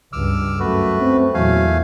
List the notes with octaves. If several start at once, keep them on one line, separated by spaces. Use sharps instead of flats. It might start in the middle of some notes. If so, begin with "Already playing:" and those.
C#2 G2 D6 E6 F6
F#2 A3 F#4 B4
C4
E2 A#2 F#3 A3 F5 G#5